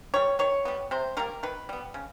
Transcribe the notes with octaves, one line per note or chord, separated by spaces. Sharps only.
D#3 G3 C#5
D#3 C#5
G3 B3
C3 C5
D#3 G3 A#3 A#4
D#3 B4
G3 B3
C#3